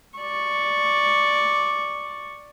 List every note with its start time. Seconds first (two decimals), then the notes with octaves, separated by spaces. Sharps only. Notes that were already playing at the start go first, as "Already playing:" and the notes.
0.19 D5 C#6